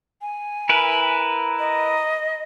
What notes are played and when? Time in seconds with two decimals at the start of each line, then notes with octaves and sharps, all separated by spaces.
0.22 G#5
0.69 E4 A#4 B4 A#5
1.59 D#5